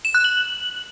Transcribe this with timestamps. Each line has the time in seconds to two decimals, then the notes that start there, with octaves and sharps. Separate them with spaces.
0.05 E7
0.15 F#6
0.24 F#7